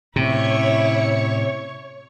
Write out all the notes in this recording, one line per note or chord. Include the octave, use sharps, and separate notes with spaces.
A2 C3 C#4 E4 C#5 C#6